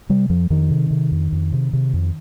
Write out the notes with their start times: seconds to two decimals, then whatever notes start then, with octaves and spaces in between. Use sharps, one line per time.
0.09 C3 G3
0.29 F2 F3
0.50 F2 D#3
0.70 C3
0.91 C3
1.12 F2
1.32 F2
1.53 C3
1.73 C3
1.93 F2